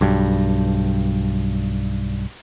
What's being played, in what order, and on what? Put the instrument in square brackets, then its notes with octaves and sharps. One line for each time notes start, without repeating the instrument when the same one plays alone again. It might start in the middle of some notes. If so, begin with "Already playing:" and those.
[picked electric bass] B1 G2